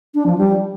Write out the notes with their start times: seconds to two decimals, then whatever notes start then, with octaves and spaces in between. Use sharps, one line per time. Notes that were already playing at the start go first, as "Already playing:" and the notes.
0.14 D4
0.26 F3
0.38 G3